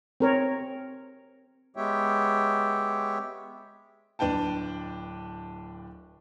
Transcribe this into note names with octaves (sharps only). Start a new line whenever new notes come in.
C4 A#4 C#5
G#3 B3 G4 C#5 E5 G5
D1 D4 B4 G5 A5